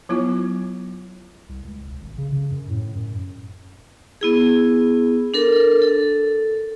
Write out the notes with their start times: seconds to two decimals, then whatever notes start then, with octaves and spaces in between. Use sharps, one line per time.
0.09 F#3 B3 E4 F4
1.49 C2
1.64 C#2
1.86 E1
2.01 G#1
2.18 C#3
2.32 C#3
2.51 F#2
2.69 A2
2.95 F#2
4.21 B3 E4 G#4
5.34 D4 A4 A#4
5.82 A4